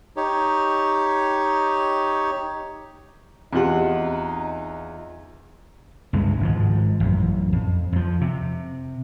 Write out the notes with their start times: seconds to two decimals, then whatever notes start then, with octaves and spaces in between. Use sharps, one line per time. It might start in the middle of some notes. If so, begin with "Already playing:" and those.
0.17 D#4 G4 C#5
3.53 E2 C4 D#4 F4 G4 F#5
6.13 C#2 G2 C3 G#3
6.40 G#1 G#2 F3
7.00 A1 F#2
7.53 F2
7.92 F2 F3
8.21 C3